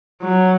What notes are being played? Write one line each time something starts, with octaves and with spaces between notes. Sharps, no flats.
F#3